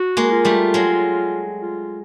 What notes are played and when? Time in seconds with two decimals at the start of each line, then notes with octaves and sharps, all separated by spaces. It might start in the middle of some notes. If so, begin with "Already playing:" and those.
Already playing: F#4
0.17 G#3 A#3
0.31 F4
0.45 G3 A3
0.74 F#3 G#3
1.61 F4